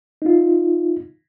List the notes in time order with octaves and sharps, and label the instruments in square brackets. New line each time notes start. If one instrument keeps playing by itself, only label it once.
[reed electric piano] D#4 F4